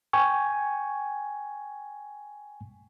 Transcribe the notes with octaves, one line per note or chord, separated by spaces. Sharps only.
G5 G#5 C#6